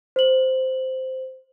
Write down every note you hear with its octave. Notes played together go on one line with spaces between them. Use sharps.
C5 F#7